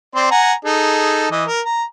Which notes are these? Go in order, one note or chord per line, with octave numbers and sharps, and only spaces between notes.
C4 D5 C6
F#5 G#5 A#5
D#4 G#4 A4
E3 D#5
A#4
A#5